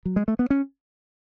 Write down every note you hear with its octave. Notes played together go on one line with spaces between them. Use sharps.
F#3
G#3
A3
B3
C#4